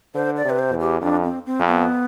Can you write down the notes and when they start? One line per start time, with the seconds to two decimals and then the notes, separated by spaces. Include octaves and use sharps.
0.15 D3 C5
0.37 D5
0.45 C3 B4
0.59 C5
0.73 E2
0.80 G4
1.01 F2 D4
1.24 C4
1.46 C4
1.59 F2
1.67 B3